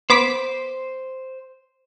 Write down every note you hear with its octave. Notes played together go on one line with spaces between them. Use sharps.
B3 C5 D6 B6